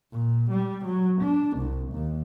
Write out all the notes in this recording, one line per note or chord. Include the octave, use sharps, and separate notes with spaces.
A#2
G3
F#3
D4
C2
D#2